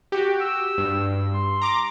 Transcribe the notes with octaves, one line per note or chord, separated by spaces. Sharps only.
F#4 G4
E6
G2
C6
A#5 D6